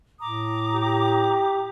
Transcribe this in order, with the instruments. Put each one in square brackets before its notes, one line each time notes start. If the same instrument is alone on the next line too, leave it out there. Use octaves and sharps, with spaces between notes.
[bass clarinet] A2 [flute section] A#5 D6 D#6
[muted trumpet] G4